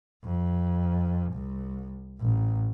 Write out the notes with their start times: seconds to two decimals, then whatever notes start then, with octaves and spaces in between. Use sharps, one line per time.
0.24 F2
1.33 C2
2.20 A1